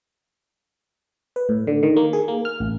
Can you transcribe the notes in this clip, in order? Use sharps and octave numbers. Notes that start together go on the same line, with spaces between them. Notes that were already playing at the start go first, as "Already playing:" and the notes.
B4
A2
D3
D#3
A#3
G#4
A#3
F6
A1